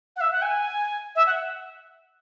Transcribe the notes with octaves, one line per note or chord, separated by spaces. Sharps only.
F#5
E5
F#5
G#5
E5
F#5